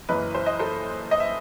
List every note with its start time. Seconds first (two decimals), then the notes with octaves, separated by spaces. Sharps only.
0.09 F#1 F#2 E3 B4 D#5
0.35 C5
0.46 D#5
0.59 A4 C5
1.11 D#5
1.20 E5